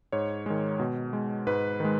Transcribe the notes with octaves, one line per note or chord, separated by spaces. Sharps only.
G#2 C#5
D#3 G#3
B2
G#3
G#2 B4
D#3 G#3